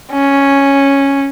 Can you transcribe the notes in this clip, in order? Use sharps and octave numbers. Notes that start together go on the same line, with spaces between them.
C#4